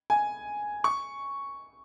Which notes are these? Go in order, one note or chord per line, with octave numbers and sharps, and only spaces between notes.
G#5
C#6